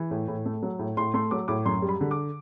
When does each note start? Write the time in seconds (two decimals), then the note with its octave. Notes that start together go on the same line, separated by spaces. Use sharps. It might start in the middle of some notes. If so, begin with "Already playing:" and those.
Already playing: E3
0.11 A2
0.28 A2
0.46 A3
0.63 F#3
0.79 A2
0.97 A2 C6
1.14 A3 C6
1.31 F#3 D6
1.48 A2 D6
1.66 F#2 C6
1.82 G3
1.89 B5
2.01 D3
2.11 D6